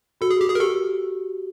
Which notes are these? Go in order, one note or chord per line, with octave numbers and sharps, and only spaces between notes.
F#4 A4
G#4
G4
G#4
A#4
G4 A4